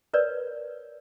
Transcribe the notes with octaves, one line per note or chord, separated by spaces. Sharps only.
A#4 B4 C#5 D5